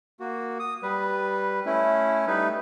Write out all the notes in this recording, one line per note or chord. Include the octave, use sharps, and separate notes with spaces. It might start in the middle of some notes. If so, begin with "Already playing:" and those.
A#3 F#4
D#6
G3 B4
A3 C#4 E4
G3 A3 D#4 B4